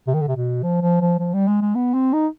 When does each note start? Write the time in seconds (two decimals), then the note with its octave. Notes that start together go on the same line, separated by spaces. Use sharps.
0.07 C3
0.14 D#3
0.21 D3
0.28 C3
0.36 B2
0.63 F3
0.82 F3
1.01 F3
1.19 F3
1.34 G3
1.48 G#3
1.61 G#3
1.75 B3
1.94 C4
2.13 D#4